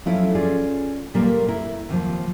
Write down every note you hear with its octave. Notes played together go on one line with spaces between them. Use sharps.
F3 F#3 A3 C#4 E4 F4
C#4 F4 G#4 D5
D2 A#2 G3 A#3 A#4 B4
E4 A#4
D#2 C3 D#3 F3